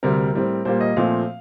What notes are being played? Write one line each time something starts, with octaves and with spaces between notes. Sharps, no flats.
D2 C3 G3 C4 A#4
A2 G3 C4
A#2 G3 A#3 C5
D#5
A#2 F3 A3 C4 F5